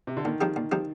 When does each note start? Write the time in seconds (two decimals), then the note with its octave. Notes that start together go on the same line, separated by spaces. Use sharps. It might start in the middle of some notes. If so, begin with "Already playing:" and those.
0.07 C3
0.17 D3
0.25 A#2 D#3
0.41 F3 C4 D#4 G4
0.56 A#2
0.72 F3 C4 D#4 G4